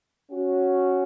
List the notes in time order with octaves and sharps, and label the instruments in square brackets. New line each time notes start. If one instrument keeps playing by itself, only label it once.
[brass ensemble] C#4 F#4